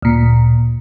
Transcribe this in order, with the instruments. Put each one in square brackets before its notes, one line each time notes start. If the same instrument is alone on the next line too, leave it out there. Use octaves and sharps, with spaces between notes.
[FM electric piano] D2 A#2